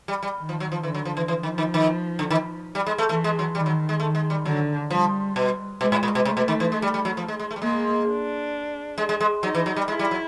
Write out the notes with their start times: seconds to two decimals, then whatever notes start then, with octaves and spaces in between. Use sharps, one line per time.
0.08 G3
0.23 G3
0.38 D#3
0.49 F3
0.60 F#3
0.72 F3
0.83 D3 E3
0.94 F#3
1.05 F3
1.17 E3
1.28 E3 F3
1.43 D#3
1.58 D#3
1.74 D#3
2.19 D3
2.30 D#3
2.75 G3
2.86 G#3
2.98 A3
3.09 E3 A3
3.24 G#3
3.39 F#3
3.54 D#3 G3
3.66 F#3
3.89 G#3
3.99 D#3 A3
4.15 G#3
4.30 G3
4.45 D3 F#3
4.90 F3 G3
5.36 B2
5.81 B2 G#3
5.92 A2
6.03 A#2
6.15 B2
6.25 C3 A3
6.37 B2
6.48 D#3
6.60 E3
6.72 G#3
6.82 G3
6.94 G3
7.05 F#3
7.17 F3
7.28 G#3
7.39 G#3
7.51 A3
7.56 G3
7.62 G#3 A#3
8.07 D4
8.98 G#3
9.09 G#3
9.20 G#3
9.42 F#3 D#4
9.55 E3
9.66 F#3
9.76 G3
9.88 G#3 E4
9.99 G3
10.11 F#3